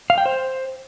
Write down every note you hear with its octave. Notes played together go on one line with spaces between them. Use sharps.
F5
G5
C5